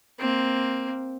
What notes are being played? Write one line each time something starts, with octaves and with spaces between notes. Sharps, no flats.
A#3 C4